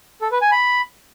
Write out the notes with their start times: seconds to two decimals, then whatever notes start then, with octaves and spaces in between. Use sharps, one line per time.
0.21 A4
0.32 B4
0.42 G#5
0.52 B5